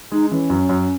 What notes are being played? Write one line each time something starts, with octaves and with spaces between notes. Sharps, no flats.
G#3 D#4
E3 C#4
F#2
F#2